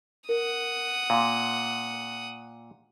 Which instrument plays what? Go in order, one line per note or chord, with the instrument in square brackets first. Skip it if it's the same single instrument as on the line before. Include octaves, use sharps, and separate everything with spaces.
[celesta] A#4 [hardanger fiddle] F#5 D#6
[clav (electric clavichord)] A#2 [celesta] F5 C6